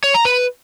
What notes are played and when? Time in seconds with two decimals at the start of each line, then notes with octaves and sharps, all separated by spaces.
0.04 C#5
0.14 A#5
0.25 B4